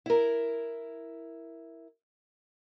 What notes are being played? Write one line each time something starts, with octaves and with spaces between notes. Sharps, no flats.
E4 A#4